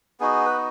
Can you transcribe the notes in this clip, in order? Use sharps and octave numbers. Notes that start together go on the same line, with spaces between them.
B3 D#4 F#4 G#4
B4